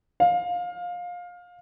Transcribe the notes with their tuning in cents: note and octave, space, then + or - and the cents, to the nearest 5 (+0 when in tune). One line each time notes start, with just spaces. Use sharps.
F5 +20